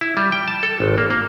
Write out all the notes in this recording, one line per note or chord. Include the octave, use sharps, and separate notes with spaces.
E4
G3
G5
A5
A4
G#1
A#3
A#3